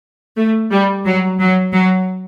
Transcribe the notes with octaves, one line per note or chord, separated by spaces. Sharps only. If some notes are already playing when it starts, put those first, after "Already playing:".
A3
G3
F#3
F#3
F#3